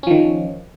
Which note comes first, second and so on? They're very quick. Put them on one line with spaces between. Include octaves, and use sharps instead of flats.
C#4 F3 D#3